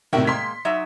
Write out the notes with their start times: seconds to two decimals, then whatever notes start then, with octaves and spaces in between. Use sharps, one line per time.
0.13 A2 C3 D#3 F#4 E5 G5
0.27 G#3 A#3 C6 B6
0.65 F#3 D#4 E5